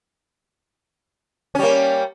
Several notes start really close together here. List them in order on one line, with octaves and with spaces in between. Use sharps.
C#4 G3 A#3